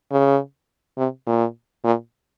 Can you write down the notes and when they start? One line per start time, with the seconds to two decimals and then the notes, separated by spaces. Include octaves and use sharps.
0.12 C#3
0.98 C3
1.27 A#2
1.84 A#2